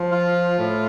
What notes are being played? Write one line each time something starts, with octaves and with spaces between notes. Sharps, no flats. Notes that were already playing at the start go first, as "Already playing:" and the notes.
Already playing: F3
F4
A2